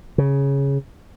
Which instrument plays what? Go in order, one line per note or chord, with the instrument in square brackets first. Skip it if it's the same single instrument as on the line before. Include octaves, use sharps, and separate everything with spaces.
[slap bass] C#3